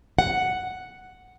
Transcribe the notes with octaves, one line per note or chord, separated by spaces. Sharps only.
F#5